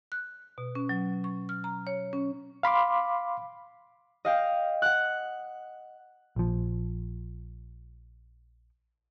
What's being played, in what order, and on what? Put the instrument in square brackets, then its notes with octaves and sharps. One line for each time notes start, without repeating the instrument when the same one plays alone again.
[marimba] F#6
B2
C#4
F#3
C#6
F6
A#5
C#5
C#4
[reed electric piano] F5 B5 C6 D6
[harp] D#5 F5 G5
F#5 F#6
[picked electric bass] A#1 F3